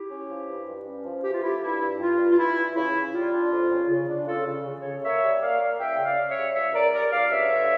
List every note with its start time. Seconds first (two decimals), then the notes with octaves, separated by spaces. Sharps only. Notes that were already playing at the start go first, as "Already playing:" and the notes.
Already playing: E4 G4
0.10 C#4
0.29 F3
0.49 G2
0.68 G2
0.86 C#4
1.05 F3
1.24 E3 G4
1.34 F4
1.42 A3 E4 G4
1.63 G2 E4
1.81 G2
1.99 G2 F4
2.19 G2
2.32 F4
2.38 E3 E4
2.56 E3
2.76 C#3 E4
2.95 C#3
3.14 G3 F4
3.32 D4
3.52 F2
3.71 C#3
3.90 C#3
4.09 D4
4.27 C#3 F4 A4
4.47 C#3
4.66 C#3
4.79 A4 C#5
4.84 C#3
5.03 A#3 C#5 E5
5.22 G3
5.42 A#3 D5 F5
5.60 A#3
5.79 C#2 E5 G5
5.98 C#3
6.04 D5 F5
6.18 C#3
6.30 C#5 E5
6.36 G3
6.55 C#2 C#5 E5
6.74 C#2 A#4 D5
6.93 G3 A#4 D5
7.12 C#2 D5 F5
7.31 G2 C#5 E5
7.51 D3